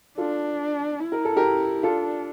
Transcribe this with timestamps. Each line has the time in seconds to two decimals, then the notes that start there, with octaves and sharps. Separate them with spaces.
0.18 D4 F4 A4
1.01 E4
1.12 A#4
1.25 A4
1.36 G4 A#4
1.83 D4 F4 A4